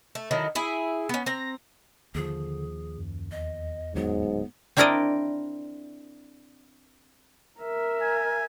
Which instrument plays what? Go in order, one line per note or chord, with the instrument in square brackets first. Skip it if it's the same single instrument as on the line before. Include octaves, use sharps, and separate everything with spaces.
[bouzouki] A3
D3 D#3 F#3 E4
E4 G#4 E5
B3 C#4
C4 A#5
[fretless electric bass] D#2 F3 [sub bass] D3 [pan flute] G#4
[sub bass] F#2
[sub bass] E2 [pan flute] D#5
[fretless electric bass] D1 F#3 [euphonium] G#2 [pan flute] B3
[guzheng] C4 D4 E4 A#4 D5 D#5
[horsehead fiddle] A#4 E5
[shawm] G#5